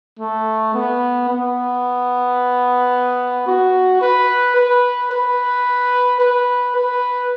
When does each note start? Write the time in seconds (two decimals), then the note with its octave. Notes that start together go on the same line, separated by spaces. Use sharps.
0.19 A3
0.74 B3
1.29 B3
3.47 F#4
4.02 B4
4.57 B4
5.11 B4
6.20 B4
6.75 B4